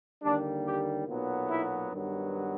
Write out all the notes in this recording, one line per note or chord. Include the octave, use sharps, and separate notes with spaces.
D#2 D3 G3 A#3 D4
G4
B1 A#2 F#3 B3
E4
G2 D#3 F#3 B3